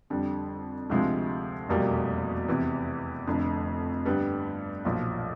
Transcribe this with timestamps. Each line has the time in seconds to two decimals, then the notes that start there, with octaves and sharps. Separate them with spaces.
0.10 F2 D3 G3
0.90 D2 C3 F3 G#3
1.69 F1 E2 B2 G3 A#3
2.48 E2 C3 E3
3.27 F1 F2 D3
4.05 G2 D3 G3 B3
4.85 B1 A#2 F3